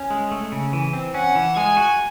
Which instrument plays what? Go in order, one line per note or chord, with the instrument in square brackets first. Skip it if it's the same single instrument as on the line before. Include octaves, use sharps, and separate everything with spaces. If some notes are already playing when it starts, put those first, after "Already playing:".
Already playing: [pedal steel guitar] C#4
G#3
A3
C#3
E3
C4
[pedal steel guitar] C#4 [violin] F#5
[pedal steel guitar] E3
[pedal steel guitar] G#3 [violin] G#5
[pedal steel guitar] F#4